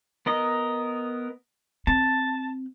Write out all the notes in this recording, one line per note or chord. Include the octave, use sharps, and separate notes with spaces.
B3 A#4 D#5
C4 A5